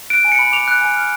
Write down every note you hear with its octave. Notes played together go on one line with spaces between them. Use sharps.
F#6 D7
G#5
C#7
B5
D6 F7
F#6
G#5
F6